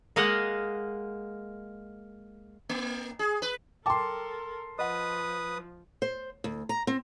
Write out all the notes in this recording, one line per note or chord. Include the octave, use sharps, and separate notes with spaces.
G#3 A#3 D#5 F5 F#5
A#3
G#4
B4
A4 A#4 G5 A5 C6 D6
F3 B4 D#5 F#5 D#6
C5
D2
A#5
C4